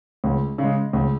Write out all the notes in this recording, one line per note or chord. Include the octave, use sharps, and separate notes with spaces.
C#2
C#3 G#3
C#2